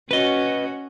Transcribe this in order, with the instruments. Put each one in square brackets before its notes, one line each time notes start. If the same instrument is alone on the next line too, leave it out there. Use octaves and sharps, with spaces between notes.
[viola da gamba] C#4 F#4 [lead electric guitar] B4 D#5